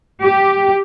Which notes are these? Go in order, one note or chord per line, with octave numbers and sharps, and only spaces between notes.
G4